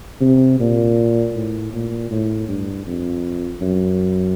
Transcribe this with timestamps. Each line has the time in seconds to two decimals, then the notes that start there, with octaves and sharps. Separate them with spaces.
0.21 C3
0.60 A#2
1.35 A2
1.73 A#2
2.11 A2
2.48 G2
2.86 F2
3.61 F#2